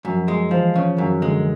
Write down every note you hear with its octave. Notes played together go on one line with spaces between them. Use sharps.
F#2 F3
G#3
E3 F3
C#3
F#2 D#3
D3 G#3